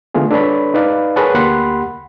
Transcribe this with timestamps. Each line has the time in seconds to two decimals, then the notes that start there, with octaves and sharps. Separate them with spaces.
0.14 D3 A3 B3 F4 G#4
0.31 D4 A4 B4 C#5 D5 B5
0.74 D#4 B4 D5 F5
1.16 G#4 A#4 B4 C#5 F#5 A5
1.34 D2 A#3 G4 F#5 B5 C6